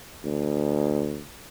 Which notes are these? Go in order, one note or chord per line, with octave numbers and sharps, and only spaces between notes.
D2